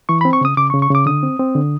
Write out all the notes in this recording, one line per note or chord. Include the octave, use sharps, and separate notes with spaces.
E3 C#6
B5
C4
C#6
C#3 D#6
C#3 D6
C#6
C#3
C#6
C#3 D6
D3 D#6
C4
C4
D3